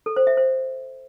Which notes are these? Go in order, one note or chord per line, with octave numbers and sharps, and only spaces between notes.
A4
C5
E5
C5